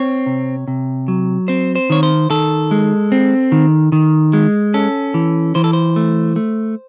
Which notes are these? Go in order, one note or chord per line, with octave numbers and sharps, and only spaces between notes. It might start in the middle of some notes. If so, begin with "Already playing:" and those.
Already playing: C4 C#5
C3
C3
F#3
C4 C5
C5
D#3 C#5
C5
D#3 A4
G#3
C4
D#3
D#3
G#3
C#4 A4
E3
E3 C5
A4
C5
A3
A3